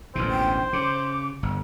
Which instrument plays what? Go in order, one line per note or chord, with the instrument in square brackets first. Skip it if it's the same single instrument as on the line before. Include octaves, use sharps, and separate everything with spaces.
[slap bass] A1 D2 B2 [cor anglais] C5
[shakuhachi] G5
[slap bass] C#3 [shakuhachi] D6
[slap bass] G1